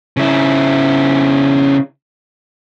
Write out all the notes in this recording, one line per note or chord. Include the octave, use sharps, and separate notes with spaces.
C#3 E4